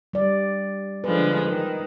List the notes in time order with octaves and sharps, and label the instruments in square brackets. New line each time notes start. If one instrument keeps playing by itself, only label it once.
[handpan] G3 D5
[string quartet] D3 F3 G#3 [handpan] B4
[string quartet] D#3